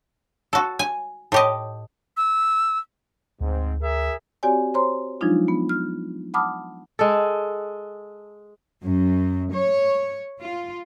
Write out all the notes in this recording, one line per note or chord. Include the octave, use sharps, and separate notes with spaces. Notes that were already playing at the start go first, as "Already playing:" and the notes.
F#4 A4
G#5
A2 G4 D#5
E6
D2 G#2 C4
G#4 A#4 E5
C4 F#4 G4 C#5 D5 G#5
C5 C#5 A#5 C6
F3 F#3 G#3 D4 D#4 F4
B3
F6
F#5 A5 B5 D6 D#6 F6
G#3 A4
F#2
C#5
F4